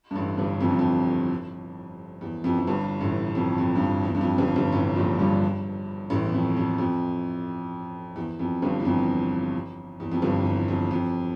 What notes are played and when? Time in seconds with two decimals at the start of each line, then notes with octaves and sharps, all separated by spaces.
0.11 G2
0.16 A1 A2
0.38 G1 G2
0.61 F2
0.70 G2
0.79 F2
2.21 E2
2.44 F2
2.51 E2
2.59 F2
2.67 G1 G2
3.01 A1 A2
3.35 F2
3.58 F2
3.76 G2
3.82 F2
4.04 E2
4.15 G2
4.21 F2
4.38 G1 G2
4.56 G1 G2
4.73 A1 A2
4.96 A#1 A#2
5.19 G2 G3
6.10 A1 A2
6.24 E2
6.33 F2
6.57 F2
6.78 F2
8.16 E2
8.40 F2
8.62 G1 G2
8.80 E2
8.85 F2
10.00 E2
10.12 F2
10.22 G1 G2
10.45 E2
10.68 F2
10.91 F2